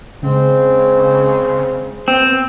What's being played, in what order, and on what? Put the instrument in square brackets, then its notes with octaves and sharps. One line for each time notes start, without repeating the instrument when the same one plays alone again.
[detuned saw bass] C#3 [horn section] G#3 C4 C5
[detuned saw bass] B3 [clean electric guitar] C4